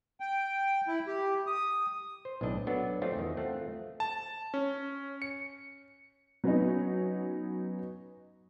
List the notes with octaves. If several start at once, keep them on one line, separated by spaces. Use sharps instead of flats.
G5
E4
G4
D#6
C5
B1 A2 E3 D4 D#5
F#3 B3 D4 A4
F3 A3 C4 D4 F4 F#4
E2 D#3
A3 C4 F4 F#5
A5
C#4
C#7
F#3 B3 C#4 D#4